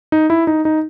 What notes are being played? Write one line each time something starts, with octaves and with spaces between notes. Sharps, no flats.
D#4
E4
D#4
D#4